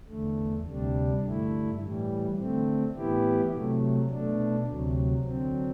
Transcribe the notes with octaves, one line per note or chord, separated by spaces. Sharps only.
E2 D3 A3
D2 C3 G3 D4
G2 D3 A3 E4
A2 E3 G3
D3 A3 C4
A2 E3 B3 E4 G4
C3 F#3 A3
B2 A3 D4
D2 C3 F#3
D3 F#3 C4